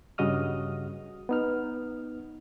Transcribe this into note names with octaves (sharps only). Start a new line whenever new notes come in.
G2 C#3 F#4 D#5 D#6 F6
B3 D#4 F6